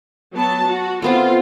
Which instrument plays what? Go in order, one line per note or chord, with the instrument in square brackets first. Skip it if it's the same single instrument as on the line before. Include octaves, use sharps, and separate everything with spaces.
[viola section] F#3 B3 A5
F#4
[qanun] A3 B3 C4 [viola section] F4